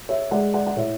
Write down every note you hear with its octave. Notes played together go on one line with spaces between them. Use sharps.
C#5 E5
G#3 D5 F#5
D5 F#5
F#5
A2 C#5 E5